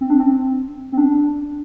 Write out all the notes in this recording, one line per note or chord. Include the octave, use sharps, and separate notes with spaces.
C4
D4
C4
C4
D4